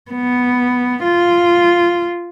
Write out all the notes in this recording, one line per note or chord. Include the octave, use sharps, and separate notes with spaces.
B3
F4